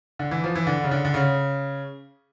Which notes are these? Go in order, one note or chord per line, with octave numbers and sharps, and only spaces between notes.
D3
E3
F3
E3
D3
C#3
D3
D3
C#3